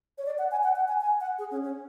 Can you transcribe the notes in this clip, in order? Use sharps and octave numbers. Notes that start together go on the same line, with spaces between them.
C#5
D5
F#5
G#5
F#5
F#5
G#5
G#5
F#5
G#4
C#4
C#4